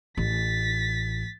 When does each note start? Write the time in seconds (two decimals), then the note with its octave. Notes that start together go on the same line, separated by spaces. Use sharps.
0.17 A1 A6 B6